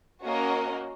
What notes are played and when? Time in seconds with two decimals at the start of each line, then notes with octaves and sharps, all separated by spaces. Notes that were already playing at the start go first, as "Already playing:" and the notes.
0.24 A#3 C#4 F#4 A#4 D#5